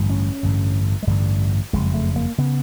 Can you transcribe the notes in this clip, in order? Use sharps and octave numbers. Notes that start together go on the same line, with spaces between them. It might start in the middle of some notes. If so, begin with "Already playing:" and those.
Already playing: A1 G2 D3
C#4
A1 G2 D3
G#3
A1 G2 D3 G3
F#1 F2 C#3 G#3
A3
A#3
C#3 B3